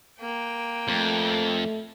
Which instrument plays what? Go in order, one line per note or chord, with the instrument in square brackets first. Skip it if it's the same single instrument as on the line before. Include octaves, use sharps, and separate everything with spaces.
[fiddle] A#3 G5
[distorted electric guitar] F2 [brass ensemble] A3